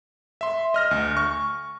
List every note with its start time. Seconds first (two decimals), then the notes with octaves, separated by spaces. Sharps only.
0.41 E5 C6
0.74 D#5 F6 A#6
0.91 D2
1.17 C#6